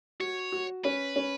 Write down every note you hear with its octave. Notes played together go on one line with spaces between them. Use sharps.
F#4 C#5
F#4
C#4 B4
C#4